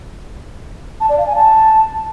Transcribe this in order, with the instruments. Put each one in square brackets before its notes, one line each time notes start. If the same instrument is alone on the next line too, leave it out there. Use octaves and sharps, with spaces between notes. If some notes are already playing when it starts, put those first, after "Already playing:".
[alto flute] A5
D5
F5
G#5
A5